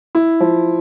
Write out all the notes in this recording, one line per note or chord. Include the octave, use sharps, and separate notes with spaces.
E4
F3